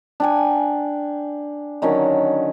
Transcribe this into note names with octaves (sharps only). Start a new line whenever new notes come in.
D4 G5 G#5
D3 D#3 F#3 C#4